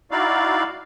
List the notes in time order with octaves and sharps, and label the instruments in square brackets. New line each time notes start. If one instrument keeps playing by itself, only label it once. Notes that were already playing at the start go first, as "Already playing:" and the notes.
[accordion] D#4 E4 F#4 D5 F5